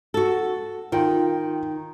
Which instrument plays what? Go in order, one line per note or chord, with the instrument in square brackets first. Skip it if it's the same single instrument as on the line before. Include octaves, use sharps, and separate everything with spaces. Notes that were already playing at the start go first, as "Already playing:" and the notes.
[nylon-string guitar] F#4 A4
[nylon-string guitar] D#3 [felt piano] F4 G5